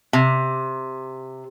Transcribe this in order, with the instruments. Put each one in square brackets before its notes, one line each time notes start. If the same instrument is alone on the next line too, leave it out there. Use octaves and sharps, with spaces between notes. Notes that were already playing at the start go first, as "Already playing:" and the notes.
[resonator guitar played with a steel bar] C3